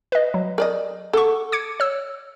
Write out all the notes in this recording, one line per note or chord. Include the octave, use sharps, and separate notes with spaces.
B4 D#5
F#3
A#4 D5 D#5
A4 F#5 C#6
D6 G#6 C#7
C#5 E6